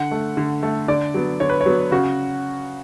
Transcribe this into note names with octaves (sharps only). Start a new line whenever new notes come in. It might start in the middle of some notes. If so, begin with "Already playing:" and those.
Already playing: D3 F#5
A3
D3
A3
D3 D5
F#3 B3
D3 C#5
B4
C#5
F#3 B3
C#3 F#4